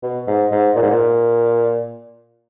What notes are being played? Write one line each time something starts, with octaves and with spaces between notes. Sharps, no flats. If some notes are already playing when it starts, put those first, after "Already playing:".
B2
G#2
G#2
A#2
G#2
A#2